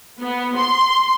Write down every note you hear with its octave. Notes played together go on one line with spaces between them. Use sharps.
B3
C6